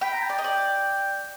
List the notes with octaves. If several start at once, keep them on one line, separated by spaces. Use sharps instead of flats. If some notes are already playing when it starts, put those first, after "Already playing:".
G5 B5
A#5
G5
D5
D#5 G5
D5